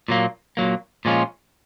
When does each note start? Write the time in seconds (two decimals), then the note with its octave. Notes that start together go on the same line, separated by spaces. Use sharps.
0.08 A#2 F#3 A#3
0.57 A#2 F#3 A#3
1.05 A#2 F3 G#3 C#4 F4